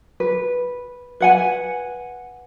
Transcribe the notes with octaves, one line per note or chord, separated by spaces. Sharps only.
B4
B4 F#5 G#5